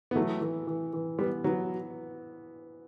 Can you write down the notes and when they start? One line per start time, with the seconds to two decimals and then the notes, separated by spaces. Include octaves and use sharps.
0.11 B3
0.15 E3 F#3 A3
0.41 E3
0.67 E3
0.93 E3
1.19 G3 B3
1.44 F#3 B3